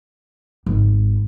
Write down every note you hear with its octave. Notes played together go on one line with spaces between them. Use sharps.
G#1